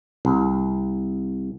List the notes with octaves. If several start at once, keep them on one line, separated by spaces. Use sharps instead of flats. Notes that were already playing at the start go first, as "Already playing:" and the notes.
C2